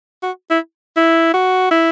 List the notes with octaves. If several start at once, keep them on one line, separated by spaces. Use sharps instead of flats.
F#4
E4
E4
F#4
E4